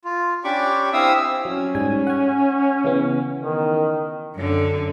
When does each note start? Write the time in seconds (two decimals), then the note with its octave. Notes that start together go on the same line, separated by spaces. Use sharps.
0.05 F4
0.44 C#4 D4 G4 B5 C#6 D6
0.93 C4 E4 E5 F5 D#6 E6
1.45 F#3 C#4
1.75 G#2 G3 G#5
2.07 F#5 G#5
2.84 C#3 E3 B3
3.41 D#3
4.34 F#2 D3